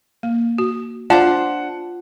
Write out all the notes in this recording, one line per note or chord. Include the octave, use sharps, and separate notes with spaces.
A#3
F#4
D4 F4 C5 D5 F#5 A5